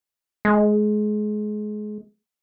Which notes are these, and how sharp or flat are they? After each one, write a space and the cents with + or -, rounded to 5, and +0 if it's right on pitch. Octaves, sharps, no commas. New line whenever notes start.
G#3 +25